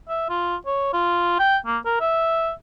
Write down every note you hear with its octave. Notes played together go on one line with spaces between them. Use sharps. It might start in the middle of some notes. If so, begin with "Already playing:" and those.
E5
F4
C#5
F4
G5
A#3
A#4
E5